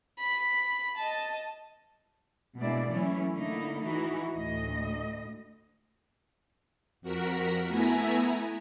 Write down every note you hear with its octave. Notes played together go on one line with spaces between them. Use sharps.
B5
D#5 A5
B2 G#3 A#3 D4 E4 D5
E3 F#3 A3 C#4 E4
D3 A3 A#3 D#4 E4
E3 D#4 E4 F#4
D2 A2 D#5
F2 F#4 A#4 B6
A3 B3 E4 G#5 A#5 B6